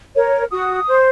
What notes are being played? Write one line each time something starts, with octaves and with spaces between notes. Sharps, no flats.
A#4 C#5
F#4 D#6
C5